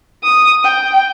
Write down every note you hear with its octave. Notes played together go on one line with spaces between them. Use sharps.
D#6
G5